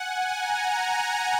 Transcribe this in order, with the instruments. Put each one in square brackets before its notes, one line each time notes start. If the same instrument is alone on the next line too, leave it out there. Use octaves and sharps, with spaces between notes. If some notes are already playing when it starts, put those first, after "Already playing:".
Already playing: [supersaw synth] F#5 G#5
A#5